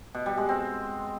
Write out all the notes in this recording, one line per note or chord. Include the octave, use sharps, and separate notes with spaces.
B2
G3
G#3
C4